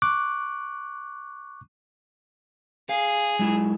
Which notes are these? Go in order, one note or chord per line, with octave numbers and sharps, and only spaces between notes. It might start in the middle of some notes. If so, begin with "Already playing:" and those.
C#6 D6 F#6
G#4 F5
F#3 G#3 E4